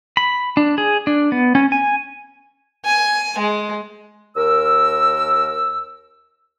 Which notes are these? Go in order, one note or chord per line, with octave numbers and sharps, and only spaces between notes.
B5
D4
G#4
D4
B3
C#4
G#5
G#5
G#3
D#2 A#4 E6